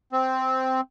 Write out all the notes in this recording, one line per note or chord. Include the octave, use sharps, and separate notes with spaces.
C4